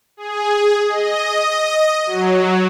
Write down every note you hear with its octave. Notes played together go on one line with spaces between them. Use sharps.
G#4
D#5
F#3